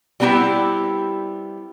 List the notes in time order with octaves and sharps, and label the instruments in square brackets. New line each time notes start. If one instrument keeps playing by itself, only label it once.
[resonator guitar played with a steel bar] G3 B3 C4 E4 G4